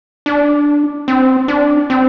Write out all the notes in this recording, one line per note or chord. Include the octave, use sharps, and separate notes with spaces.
D4
C4
D4
C4